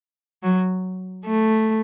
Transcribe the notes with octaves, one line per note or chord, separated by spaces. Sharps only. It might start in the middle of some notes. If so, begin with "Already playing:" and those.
F#3
A3